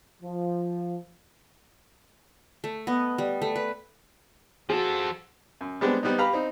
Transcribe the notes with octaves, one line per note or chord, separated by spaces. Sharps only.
F3
A3
B3 D#5
G3
A3
B4
F3 F#4 G#4 A4
F#2
G3 G#3 B3 C4 D4 G4
G3 B3 C4 D#4
G4 B4 F5 A#5 B5
C4 D#4